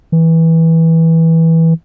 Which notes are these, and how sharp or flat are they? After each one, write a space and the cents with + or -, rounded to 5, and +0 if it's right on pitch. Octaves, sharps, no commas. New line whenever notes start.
E3 -15